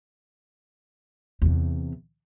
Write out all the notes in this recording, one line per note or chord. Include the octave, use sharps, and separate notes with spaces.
E2 C3